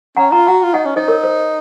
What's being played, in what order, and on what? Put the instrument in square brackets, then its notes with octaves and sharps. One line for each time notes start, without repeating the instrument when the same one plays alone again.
[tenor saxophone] C#4 [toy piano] F#5 A#5
[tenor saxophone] F4 [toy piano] F#5 A#5
[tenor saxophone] F#4 [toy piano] F#5 A#5
[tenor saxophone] F4
[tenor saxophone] D#4 [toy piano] D#5 F#5
[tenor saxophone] C#4
[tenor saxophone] D#4 [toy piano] C5 D#5
[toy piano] A#4 C#5
C5